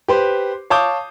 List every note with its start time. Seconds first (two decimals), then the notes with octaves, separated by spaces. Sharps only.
0.08 G4 B4 C5
0.70 C#5 F5 A5 D6 D#6 G6